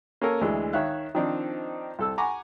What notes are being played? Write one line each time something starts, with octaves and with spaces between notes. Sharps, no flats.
A#3 C#4 A4 A#4
D2 E3 G#3
D#3 C#5 E5 F5 F#6
D#3 F3 C4 D4 D#4
C2 A4 E6
F#5 G#5 A#5 B5 C#6 D6